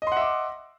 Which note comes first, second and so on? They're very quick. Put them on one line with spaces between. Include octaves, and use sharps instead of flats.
D#5 C6 F#5 E5 D6